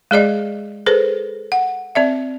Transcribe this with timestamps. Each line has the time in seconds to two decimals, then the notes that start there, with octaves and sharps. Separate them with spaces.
0.11 G#3 G#4 D5 D#5
0.86 G#4 A4 B4 C5
1.52 F#5
1.95 C4 D5 E5